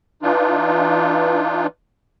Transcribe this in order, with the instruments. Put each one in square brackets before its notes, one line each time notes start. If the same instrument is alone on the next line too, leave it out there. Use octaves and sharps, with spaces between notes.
[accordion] E3 D4 D#4 F4